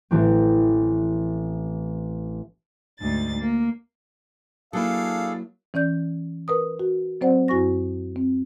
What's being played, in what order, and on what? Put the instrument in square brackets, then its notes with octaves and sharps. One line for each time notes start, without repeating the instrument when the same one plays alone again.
[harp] A1 E3 C4
[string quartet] D2 G#2 A6
A#3
[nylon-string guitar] F#3 A#3 E4 [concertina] D4 G#4 A4 [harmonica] F5
[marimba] E3 C#4 D5 G6
A#4 B4 D#6
F#4
F#3 C4 C5 D5 F#5
F#2 E4 F#4 G#5 C#6 A#6
C4